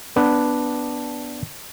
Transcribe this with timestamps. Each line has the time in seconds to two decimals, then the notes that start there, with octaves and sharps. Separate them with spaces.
0.16 B3 D4 B4